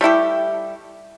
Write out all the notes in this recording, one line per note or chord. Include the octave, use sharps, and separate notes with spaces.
G3 A3 E4 G4